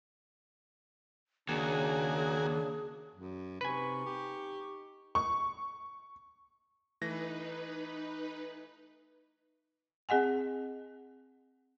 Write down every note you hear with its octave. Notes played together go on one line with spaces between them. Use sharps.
D#2 C#3 A#3 D4 F#4 G#4 G#5
F#2
C3 D#4 B4 G#5 C#6
G4
C#6
E3 A3 D#4 B4 A#6
C4 G#4 D#5 F#5 G#5